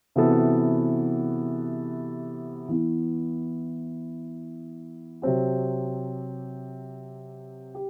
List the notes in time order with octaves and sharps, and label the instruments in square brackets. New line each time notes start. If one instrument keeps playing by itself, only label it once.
[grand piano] C3 E3 B3 F#4 A4
E3 B3 E4
C3 F#3 C4 G4
G4